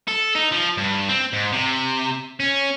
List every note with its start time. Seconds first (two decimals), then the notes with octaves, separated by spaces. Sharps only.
0.08 A4
0.35 D#4
0.52 F3
0.78 G2
1.09 C4
1.33 G#2
1.53 C3
2.40 C#4